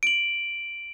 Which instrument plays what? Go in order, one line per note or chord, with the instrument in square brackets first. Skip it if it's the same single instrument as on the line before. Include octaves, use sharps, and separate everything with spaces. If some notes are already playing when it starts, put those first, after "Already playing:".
[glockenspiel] D7 F#7